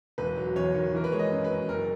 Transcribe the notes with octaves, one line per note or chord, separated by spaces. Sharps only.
E1 B4
F#3
E2 C#5
D#3
E3 A#4
B4
G#3 C#5
D#5
F#2
B4
F#2
F#1 A#4